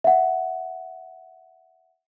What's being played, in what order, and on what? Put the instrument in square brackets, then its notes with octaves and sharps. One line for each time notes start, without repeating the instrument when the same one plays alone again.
[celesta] E5 F#5